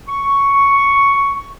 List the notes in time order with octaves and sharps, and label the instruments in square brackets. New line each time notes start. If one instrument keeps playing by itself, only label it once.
[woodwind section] C#6